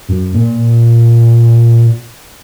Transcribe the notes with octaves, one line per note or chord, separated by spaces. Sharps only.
F#2
A#2